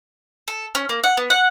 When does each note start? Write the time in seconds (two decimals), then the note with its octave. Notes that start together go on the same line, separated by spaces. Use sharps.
0.48 A4
0.75 C#4
0.89 A#3
1.04 F#5
1.17 B3
1.30 F#5